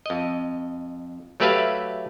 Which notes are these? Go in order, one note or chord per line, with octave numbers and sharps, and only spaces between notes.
F2 D#5
F#3 A3 G4 B4 E5 F5